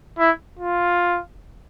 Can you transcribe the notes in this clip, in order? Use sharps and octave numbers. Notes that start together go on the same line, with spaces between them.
E4
F4